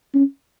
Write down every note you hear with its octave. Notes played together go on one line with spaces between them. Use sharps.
C#4